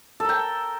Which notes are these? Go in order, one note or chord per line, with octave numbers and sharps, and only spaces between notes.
A4 A#4 G5